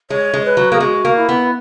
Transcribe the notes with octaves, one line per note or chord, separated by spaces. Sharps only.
G#3 C#5
G#3
B4
F#3
A#3 G#4
G#3 F#4
A#3
E4
B3